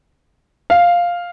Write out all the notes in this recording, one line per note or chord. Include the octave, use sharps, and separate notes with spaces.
F5